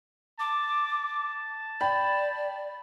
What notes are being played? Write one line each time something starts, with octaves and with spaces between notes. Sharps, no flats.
A5 D6
D5 G5 B5